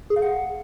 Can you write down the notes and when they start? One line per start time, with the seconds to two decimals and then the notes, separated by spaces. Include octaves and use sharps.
0.10 G#4
0.16 F5
0.22 F#5